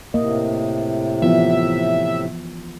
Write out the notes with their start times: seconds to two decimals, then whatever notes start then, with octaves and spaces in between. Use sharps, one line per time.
0.14 A2 C3 A#3 D#5
1.22 E3 F3 B3 E5